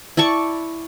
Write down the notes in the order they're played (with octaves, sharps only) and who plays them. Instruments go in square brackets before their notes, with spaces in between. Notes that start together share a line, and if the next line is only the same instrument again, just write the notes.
[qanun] E4 D5 A5 C#6